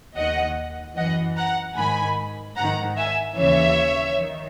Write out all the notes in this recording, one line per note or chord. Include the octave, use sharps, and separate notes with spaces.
D#2 D#3 D#5 F#5
F#2 E3 D#5 F#5
F#5 A#5
G#2 D#3 G#5 B5
G#2 D#3 F#5 A#5
E5 G#5
D#2 C#3 E3 C#5 E5
D#3